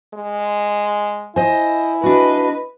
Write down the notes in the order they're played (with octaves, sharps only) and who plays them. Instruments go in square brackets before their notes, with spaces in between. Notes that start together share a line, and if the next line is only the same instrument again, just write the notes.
[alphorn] G#3
[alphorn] E4 [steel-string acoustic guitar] C5 D#5 [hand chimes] G#5
[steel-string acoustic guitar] D4 F#4 [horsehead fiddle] B4 D#5